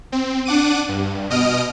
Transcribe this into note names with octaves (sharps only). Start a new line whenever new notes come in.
C4
D4 F#5 D6 D#7
G2
B2 D#5 D#6 F6 D7